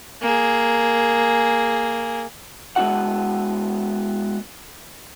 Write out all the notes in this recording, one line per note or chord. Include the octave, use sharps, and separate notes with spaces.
A#3 G#4
G#3 B3 D4 F#4 F#5